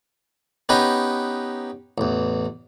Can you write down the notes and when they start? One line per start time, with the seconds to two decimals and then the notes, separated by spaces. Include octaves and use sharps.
0.69 B3 C#4 D#4 G4 B4 D#5
1.98 A1 E2